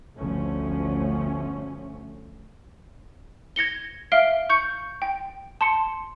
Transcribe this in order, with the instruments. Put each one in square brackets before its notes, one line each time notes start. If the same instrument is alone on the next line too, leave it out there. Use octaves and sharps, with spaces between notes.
[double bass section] G1 D2 F3 A3 C#4
[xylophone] G#6 A#6 C#7 G7
E5 F5 F6 D7 G7
C#6 G6 C#7
G5
A5 C6 C#7